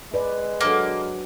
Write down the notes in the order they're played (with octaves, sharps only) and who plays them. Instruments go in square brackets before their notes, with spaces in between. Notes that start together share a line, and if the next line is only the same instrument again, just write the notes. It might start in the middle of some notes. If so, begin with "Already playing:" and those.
[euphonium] G#3 [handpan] B4 D5
[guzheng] F#3 D4 A4 [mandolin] A#3